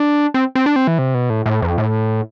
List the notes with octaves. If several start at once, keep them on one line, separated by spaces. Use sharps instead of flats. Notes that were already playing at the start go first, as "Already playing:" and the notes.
Already playing: D4
C4
C4
D4
C4
E3
C3
B2
A2
A2
F2
A2